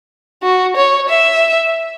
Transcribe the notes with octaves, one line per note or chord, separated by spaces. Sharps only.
F#4
C#5
E5